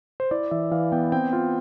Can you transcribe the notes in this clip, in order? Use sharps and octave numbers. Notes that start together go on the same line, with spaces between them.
C5
E4 D5
E3 E5
E3 F5
B3 G5
C4 G5
F4